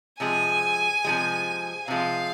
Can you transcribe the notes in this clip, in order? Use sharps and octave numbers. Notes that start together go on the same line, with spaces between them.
C3 F3 G#3 G#5
C3 F3 G#3
C3 F3 G#3 F5